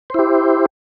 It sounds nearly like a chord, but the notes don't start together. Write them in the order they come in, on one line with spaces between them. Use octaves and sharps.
C5 E4 G4